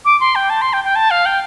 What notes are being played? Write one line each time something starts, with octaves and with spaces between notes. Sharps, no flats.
D6
C6
G5
A5
C6
G5
G5
A5
F5
G5